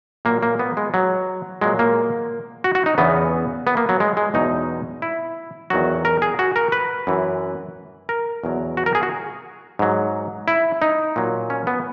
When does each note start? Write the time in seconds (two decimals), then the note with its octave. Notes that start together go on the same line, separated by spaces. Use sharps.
0.25 A#2 F#3 A#3
0.43 A#3
0.59 B3
0.77 G#3
0.94 F#3
1.61 A#2 F#3 G#3
1.79 A#3
2.64 F#4
2.75 F#4
2.86 D#4
2.98 E2 C#3 E3 B3
3.67 B3
3.77 A#3
3.89 F#3
4.00 G#3
4.17 G#3
4.34 E2 B2 F#3 D#4
5.02 E4
5.70 E2 D#3 F#3 F#4
6.05 A#4
6.22 G#4
6.39 F#4
6.56 A#4
6.72 B4
7.07 F#2 E3
8.09 A#4
8.44 E2 B2 F#3
8.77 F#4
8.86 A#4
8.95 G#4
9.03 F#4
9.79 G#2 F#3
10.48 E4
10.82 D#4
11.16 A#2 F#3
11.50 C#4
11.67 B3